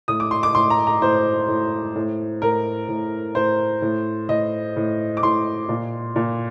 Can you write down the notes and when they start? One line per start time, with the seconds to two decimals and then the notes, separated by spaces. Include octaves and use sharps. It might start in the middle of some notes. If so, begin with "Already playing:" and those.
0.08 A2 D#6
0.20 D6
0.31 C6
0.43 D6
0.55 A2 C6
0.70 A#5
0.87 A#5
1.02 A2 C5
1.48 A2
1.95 A2
2.42 A2 A#4
2.88 A2
3.35 A2 C5
3.82 A2
4.29 A2 D#5
4.76 A2
5.17 D6
5.23 A2 C6
5.69 A#2
6.16 A#2